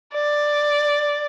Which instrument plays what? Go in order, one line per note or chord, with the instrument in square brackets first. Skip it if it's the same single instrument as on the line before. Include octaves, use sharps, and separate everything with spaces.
[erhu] D5